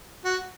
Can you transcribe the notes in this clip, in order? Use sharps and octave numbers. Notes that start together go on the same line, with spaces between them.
F#4